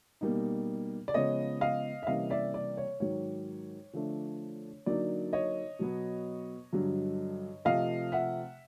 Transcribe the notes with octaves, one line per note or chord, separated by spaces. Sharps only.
B2 G3 A#3 D#4
D5
C#3 F3 G#3 B3 C#5 D#5
D#5 F5
E5
C3 E3 G3 A#3 C#4 D#5 F5
D5 E5
D5
C#5
G#2 D#3 F#3 C#5
D3 F3 A3 D4
D3 F#3 A#3 D#4 D5
C#5 D#5
B2 F#3 B3
G2 D3 F#3
C3 F3 A3 D#5 F5
E5 F#5